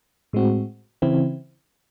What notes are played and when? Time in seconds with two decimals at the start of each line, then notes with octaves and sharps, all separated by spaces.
0.33 A2 G#3 C4 F#4
1.02 C#3 E3 C4 E4